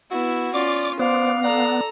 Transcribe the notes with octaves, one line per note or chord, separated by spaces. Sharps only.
B3 E4 F#4
C#4 F4 D5 D6
B3 C5 D5 F5
A4 D5 A#5